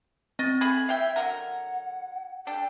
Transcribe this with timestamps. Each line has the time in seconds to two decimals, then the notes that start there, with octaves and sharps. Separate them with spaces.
0.39 C4 D#5 A6
0.61 A3 G#4 B5 G#6
0.89 E5 F5 G5
1.16 D3 F#3 A#4 F#5
2.47 D4 A4 G5